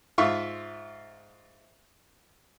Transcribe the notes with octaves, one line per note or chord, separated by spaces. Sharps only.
G#2 F4 E5 C#6